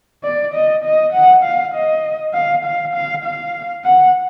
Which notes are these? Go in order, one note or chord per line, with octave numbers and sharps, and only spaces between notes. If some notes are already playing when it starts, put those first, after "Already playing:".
D5
D#5
D#5
F#5
F5
D#5
F5
F5
F5
F5
F#5